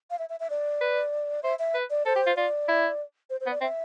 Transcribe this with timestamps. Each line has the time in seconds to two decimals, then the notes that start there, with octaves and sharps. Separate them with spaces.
0.11 F5
0.19 E5
0.30 E5
0.40 E5
0.50 D5
0.81 B4
1.43 C5 E5
1.59 E5
1.74 B4
1.90 D5
2.06 A4 C5
2.16 G4
2.26 F4
2.37 F4 D5
2.68 E4
3.30 C5
3.41 C5
3.46 B3
3.51 D5
3.61 C4 E5